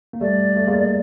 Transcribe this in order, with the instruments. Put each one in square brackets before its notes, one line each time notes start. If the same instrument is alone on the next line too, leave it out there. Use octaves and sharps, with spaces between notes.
[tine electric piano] A#3
[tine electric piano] G3 A3 [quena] D5
[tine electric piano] A3
G#3 A#3